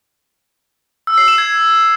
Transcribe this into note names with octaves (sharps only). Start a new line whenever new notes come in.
E6
C7
E7
G#6